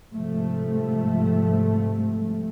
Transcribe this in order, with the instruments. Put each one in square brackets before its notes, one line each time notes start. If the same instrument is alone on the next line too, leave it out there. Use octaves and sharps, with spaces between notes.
[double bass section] G#2 C3 F3 G3 A3